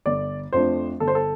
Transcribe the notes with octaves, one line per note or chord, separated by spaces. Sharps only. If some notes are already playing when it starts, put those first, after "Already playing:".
G1 D5
F2 F3 A3 D4 C5
G1 A4
C5
A4